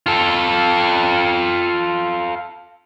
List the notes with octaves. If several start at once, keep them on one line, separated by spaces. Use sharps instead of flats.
F4 A4